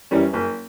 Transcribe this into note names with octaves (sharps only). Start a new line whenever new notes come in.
F#2 E3 G3 C#4
F#1